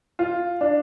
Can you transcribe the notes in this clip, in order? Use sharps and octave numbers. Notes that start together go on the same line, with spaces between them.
F4
D4